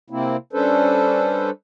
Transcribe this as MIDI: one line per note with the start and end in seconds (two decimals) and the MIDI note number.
0.10 0.37 48
0.10 0.37 58
0.10 0.37 60
0.10 0.37 64
0.53 1.50 55
0.53 1.50 61
0.53 1.50 62
0.53 1.50 69
0.53 1.50 71
0.53 1.50 72